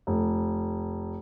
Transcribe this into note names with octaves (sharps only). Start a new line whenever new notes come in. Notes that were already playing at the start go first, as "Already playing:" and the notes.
F1